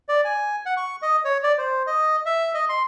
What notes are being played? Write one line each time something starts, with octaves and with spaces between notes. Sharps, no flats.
D5
G#5
F#5
C#6
D#5
C#5
D5
C5
D#5
E5
D#5
C6